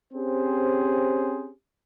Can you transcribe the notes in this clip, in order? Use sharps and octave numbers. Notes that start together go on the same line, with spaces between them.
C4 C#4 G4 G#4 C5